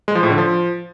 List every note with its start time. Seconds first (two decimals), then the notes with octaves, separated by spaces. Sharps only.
0.08 G#3
0.15 F3
0.23 A2
0.30 D3
0.38 F3